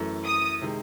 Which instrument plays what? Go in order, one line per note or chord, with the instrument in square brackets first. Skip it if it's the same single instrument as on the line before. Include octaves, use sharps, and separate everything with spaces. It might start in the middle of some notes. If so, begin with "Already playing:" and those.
Already playing: [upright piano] F#2 E3 A3
[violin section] D#6
[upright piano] C3 D#3 G#3